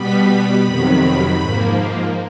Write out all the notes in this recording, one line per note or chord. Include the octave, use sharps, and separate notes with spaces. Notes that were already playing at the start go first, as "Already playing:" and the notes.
Already playing: B2 G3 B3 B5
F2 C3 D#3 F#3
G#2 F3 A#3